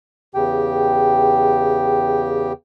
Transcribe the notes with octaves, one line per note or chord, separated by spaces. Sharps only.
E2 C#3 G4 G5